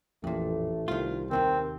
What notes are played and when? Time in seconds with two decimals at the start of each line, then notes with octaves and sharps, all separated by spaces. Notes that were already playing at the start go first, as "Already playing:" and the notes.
0.24 A1 F2 A#2 A3
0.88 C2 D#3 F4
1.31 D#2 C3 D#3 C4 A#4